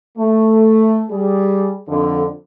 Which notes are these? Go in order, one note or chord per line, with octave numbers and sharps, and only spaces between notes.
A3
G3 G#4
F2 D3